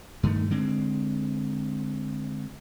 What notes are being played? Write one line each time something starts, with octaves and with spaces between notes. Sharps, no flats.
G2 D#3 A3
D3 G#3 C4